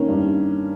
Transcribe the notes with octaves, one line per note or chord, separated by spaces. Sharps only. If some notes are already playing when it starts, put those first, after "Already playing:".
Already playing: D#3 A#3 C#4
G2